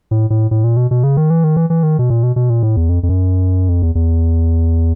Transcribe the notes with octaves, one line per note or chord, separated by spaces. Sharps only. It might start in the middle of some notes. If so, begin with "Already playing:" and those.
A2
A2
A2
A#2
B2
B2
C#3
D#3
E3
D#3
E3
E3
D#3
B2
A#2
B2
B2
A#2
A2
E2
F2
F2
F#2
F2
E2
E2